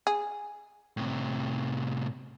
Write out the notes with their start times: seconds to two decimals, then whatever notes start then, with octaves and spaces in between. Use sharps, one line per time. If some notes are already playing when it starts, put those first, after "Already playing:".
0.07 G#4
0.97 A2 C3